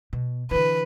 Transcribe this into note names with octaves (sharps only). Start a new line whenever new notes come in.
B2
D3 E3 B4